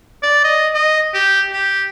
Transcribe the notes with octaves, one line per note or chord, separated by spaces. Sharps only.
D5
D#5
D#5
G4
G4